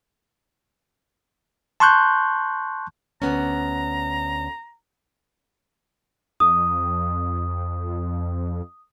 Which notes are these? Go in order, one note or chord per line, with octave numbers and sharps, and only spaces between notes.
A5 C6 C#6 F#6 G6
D2 B3 C#4 A#5
F2 D#6